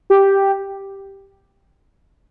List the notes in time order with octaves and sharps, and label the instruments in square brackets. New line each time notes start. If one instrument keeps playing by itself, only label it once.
[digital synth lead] G4